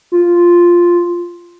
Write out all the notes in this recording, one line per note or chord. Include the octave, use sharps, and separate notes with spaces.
F4